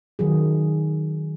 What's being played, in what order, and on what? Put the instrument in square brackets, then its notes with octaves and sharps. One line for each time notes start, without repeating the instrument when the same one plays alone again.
[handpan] D#3 F#3 G#4